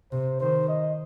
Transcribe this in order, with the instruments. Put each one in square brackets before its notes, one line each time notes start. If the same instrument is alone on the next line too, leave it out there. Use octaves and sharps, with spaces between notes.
[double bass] C3 [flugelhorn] C5
[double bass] D#3 [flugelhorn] C5
[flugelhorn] D#5